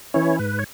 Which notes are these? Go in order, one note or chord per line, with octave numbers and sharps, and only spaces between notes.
E3 C#4 E4 C#5
G#2 B4
C#5